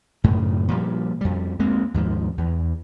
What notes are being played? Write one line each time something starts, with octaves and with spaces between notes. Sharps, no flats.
F#2 A2 C#3
A#2 F3 G3
F2 G3
D2 G#3 A#3 C4
D#2 G#2 F3
E2